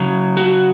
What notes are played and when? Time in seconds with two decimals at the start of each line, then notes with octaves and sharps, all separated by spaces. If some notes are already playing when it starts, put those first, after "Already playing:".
Already playing: C#3 F#3
0.37 F#4